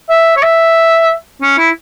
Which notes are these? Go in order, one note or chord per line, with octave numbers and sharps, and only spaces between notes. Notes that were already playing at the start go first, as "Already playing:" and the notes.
E5
C#5
E5
C#4
E4